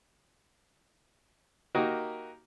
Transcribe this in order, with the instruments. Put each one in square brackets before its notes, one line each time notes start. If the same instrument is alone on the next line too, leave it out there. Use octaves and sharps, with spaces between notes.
[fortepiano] A#3 D#4 F#4 G4 A#4